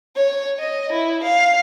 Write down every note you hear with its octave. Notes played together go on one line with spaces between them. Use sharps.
C#5
D#5
E4
F5